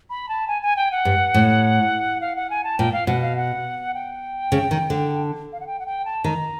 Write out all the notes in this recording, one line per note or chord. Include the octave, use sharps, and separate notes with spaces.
B5
A5
G#5
G#5
G5
F#5
G2
A2
F5
F#5
G#5
A5
A#2 G5
F5
B2 F#5
F5
F#5
G5
C#3
D#3
D3
F5
F#5
G5
F#5
G5
A5
D#3 A#5